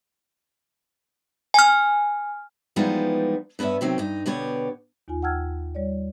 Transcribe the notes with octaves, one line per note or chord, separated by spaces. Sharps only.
G#5 F6
E3 F3 G3 G#3 B3 D#4
G2 B3 B4 C#5 E5
C3 D#3 F#3 C4
G2 D#4
B2 D3 B3 G4 C#5
D#2 D#4 F4 G#5
F#5 G5 A5 E6 F6 G#6
G3 C#5 D5